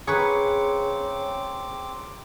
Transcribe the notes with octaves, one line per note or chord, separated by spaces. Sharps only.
C#3 C4 G#4 B4 A#5 C#6 D6 C#7